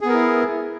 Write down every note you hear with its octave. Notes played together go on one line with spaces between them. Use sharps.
B3 E4 G#4 A#4